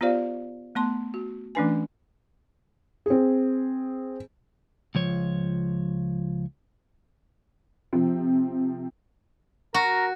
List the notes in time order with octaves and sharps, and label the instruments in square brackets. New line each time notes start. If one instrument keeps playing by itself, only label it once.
[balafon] B3 F4 G4 C5 D5 F5
A3 B3 A5 C6
F#4
E3 A3 C#4 D4 B4 G#5
[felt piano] C4 G#4
[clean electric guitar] C#2 F3 C#5
[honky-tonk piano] C3 F3 C4
[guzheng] F#4 [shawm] A#4